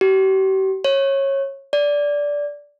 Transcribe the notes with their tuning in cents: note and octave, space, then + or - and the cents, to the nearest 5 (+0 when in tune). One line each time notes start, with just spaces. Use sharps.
G4 -40
C#5 -20
D5 -15